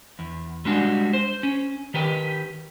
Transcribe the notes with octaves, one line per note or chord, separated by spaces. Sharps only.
E2
G3 G#3 D4 F#4
C5
C#4
D#3 G4 B4 G5